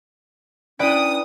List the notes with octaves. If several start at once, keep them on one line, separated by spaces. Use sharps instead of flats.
C#4 D4 E4 B4 D5 G5 D#6